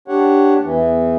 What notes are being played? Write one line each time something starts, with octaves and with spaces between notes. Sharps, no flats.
D4 G4 C#5 F#5
E2 E3